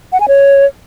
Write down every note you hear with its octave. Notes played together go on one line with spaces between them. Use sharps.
F#5
G#5
C#5